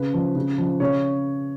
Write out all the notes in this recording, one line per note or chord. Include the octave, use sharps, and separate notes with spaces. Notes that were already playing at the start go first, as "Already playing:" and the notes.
Already playing: C#3 B4
F3
C#3
F3
C#3 C#5